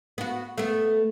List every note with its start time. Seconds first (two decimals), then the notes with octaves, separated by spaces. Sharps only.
0.18 B3 F#4
0.58 A3 B3